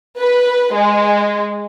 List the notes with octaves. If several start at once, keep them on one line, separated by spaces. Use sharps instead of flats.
B4
G#3